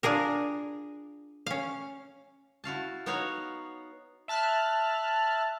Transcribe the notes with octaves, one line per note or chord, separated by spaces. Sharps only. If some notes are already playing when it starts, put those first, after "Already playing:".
D4 F4 G#4 A#4
C#4 F5
E4 F#4 F5 A5
B3 D#4 F#4 C#5 F5 F#5
E5 A5 F6 F#6